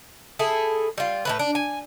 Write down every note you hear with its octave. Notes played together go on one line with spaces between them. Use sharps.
E4 G#4 A4
G3 F4
A2 F3 B4
D4
G#5